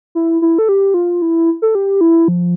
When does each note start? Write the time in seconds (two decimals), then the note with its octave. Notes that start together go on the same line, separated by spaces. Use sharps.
0.15 E4
0.42 E4
0.58 A4
0.69 G4
0.94 F4
1.22 E4
1.62 A4
1.75 G4
2.01 E4
2.28 F3